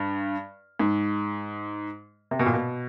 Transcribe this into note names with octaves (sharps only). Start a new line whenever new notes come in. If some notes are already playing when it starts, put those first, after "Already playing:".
Already playing: G2
G#2
C3
B2
A#2
B2